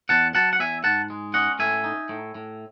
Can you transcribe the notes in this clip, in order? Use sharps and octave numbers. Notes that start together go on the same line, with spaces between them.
E2 F#5 A5
F#3 F#5 A5
F#5
E2 E5 G#5
G#2 F#5 A5
G#3
C#4 D#5 F#5
A2 E5 G#5
D#4
A2
A2